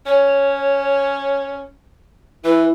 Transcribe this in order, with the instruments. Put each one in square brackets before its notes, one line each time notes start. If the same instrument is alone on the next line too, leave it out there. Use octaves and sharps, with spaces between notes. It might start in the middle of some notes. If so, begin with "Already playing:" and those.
[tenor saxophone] C#4 [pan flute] C#5
[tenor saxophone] E3 [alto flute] E4 [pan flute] B4